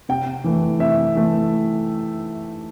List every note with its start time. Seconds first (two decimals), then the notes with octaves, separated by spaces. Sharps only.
0.09 C3 G5
0.44 E3 A3
0.79 C3 E5
1.15 E3 A3